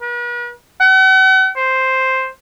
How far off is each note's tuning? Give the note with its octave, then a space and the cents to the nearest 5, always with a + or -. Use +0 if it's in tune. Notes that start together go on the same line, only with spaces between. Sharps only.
B4 -45
F#5 +40
C5 +0